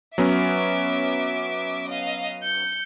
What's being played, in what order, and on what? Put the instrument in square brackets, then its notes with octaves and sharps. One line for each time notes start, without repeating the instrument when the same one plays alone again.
[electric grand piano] F#3 B3 C#4 [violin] E5 D6
[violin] D#5 F5
G6 C#7